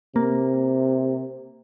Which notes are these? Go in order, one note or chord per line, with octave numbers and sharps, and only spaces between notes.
C3 A#3